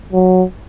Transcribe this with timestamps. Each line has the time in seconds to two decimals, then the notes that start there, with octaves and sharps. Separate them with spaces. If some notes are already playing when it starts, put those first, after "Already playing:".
0.13 F#3